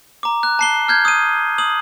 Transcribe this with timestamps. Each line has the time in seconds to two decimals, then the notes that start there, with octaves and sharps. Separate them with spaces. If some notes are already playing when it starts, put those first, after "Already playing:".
0.23 A#5 D6
0.43 F#6
0.59 A5 C7 G7
0.88 F6 G6 G#6
1.05 D#6 D#7
1.58 D#6 F#7